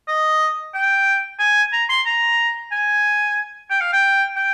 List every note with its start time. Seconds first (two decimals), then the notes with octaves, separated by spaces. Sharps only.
0.08 D#5
0.74 G5
1.39 G#5
1.73 A#5
1.90 C6
2.06 A#5
2.72 G#5
3.70 G5
3.81 F5
3.93 G5
4.36 G5